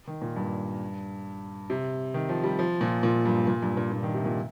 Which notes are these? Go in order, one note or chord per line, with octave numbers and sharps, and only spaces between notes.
D#3
A#2
G2
C3
D#3
F3
G3
F3
A#2
A#2
G2
A#2
G2
A#2
A#2
D#3
C3
A#2